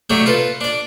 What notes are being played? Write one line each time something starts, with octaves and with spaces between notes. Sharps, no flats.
F#3 A3 D4 G4
F4 A4 B4
D4 D5